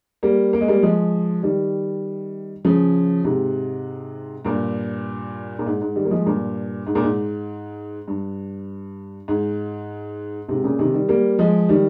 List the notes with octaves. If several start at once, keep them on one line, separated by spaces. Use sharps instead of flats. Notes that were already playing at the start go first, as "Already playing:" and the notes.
G3 A#3
A#3
G#3
G3 A#3
F3 G#3
D#3 G3
C#3 F3
G#2 C3
G2 A#2
A#2
G#2
G#2
D#3 G3
A#3
F3 G#3
G2 A#2
G#2
A#2
G#2
G2
G#2
G#2 C3
A#2 C#3
C3 D#3
D#3 G3
G3 A#3
F3 G#3
D#3 G3